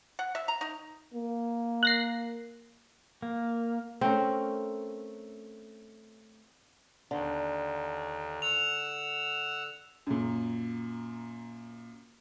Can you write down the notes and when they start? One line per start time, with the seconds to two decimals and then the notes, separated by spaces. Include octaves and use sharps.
0.19 F#5
0.35 E5
0.48 A#5
0.61 D#4
1.14 A#3
1.83 F#6 A#6 C7
3.22 A#3
4.01 A3 C4 C#4 A#4
7.11 D#2 D3
8.42 F#5 E6 F7
10.07 F#2 A#2